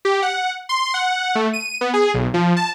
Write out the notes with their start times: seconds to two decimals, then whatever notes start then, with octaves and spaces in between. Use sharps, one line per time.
0.05 G4
0.22 F#5
0.69 C6
0.94 F#5
1.35 A3
1.53 D#7
1.81 B3
1.94 G#4
2.14 B1
2.34 F3
2.57 A5